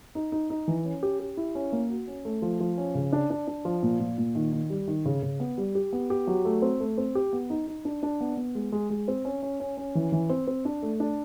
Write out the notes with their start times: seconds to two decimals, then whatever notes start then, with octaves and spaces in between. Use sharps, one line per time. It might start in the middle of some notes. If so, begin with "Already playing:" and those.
0.15 D#4
0.32 D#4
0.50 D#4
0.68 E3
0.85 C#4
1.03 G4
1.20 G4
1.37 E4
1.55 C#4
1.72 A#3
1.90 F#4
2.08 C#4
2.25 A3
2.42 F3
2.60 F3
2.78 C#4
2.95 C#3
3.12 D4
3.30 D4
3.47 D4
3.65 F3
3.83 A#2
4.00 A#2
4.18 A#2
4.35 D#3
4.53 D#3
4.70 G3
4.88 D#3
5.05 C#3
5.22 C#3
5.40 B3
5.58 G3
5.75 G4
5.93 B3
6.10 G4
6.27 F#3
6.45 A3
6.62 C4
6.80 A3
6.98 C4
7.15 G4
7.33 B3
7.50 D#4
7.67 D#4
7.85 D4
8.03 D4
8.20 B3
8.37 B3
8.55 G#3
8.72 G#3
8.90 G#3
9.08 C4
9.25 C#4
9.43 C#4
9.60 C#4
9.77 C#4
9.95 E3
10.12 E3
10.30 C4
10.47 C4
10.65 D4
10.82 A3
11.00 D4